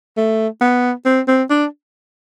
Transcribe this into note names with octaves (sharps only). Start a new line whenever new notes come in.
A3
B3
C4
C4
D4